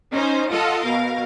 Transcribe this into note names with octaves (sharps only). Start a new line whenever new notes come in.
C#4 D#4 C5
F4 A4 D#5 F#5
B2 A#4 F5